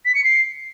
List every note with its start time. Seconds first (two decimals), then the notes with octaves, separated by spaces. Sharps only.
0.05 B6
0.15 C#7
0.24 C7